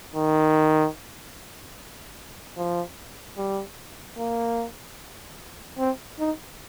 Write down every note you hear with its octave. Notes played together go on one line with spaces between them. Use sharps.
D#3
F3
G3
A#3
C4
D#4